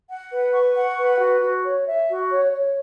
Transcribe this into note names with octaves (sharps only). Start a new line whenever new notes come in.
F#5
B4
C#6
F#5
B4
F#4
F#4
C#5
E5
F#4
C#5
C#5